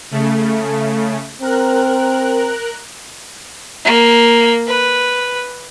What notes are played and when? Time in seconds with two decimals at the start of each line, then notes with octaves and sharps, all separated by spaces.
0.11 C#3 A3
1.42 C4 A#4 F#6
3.85 A#3
4.67 B4